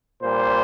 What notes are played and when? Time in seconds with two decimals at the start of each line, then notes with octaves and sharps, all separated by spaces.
0.22 A#2 G3 C5